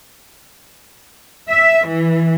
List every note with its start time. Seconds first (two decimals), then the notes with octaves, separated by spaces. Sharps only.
1.50 E5
1.87 E3